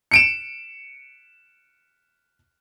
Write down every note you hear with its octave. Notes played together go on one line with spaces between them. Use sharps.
C#7 D7 E7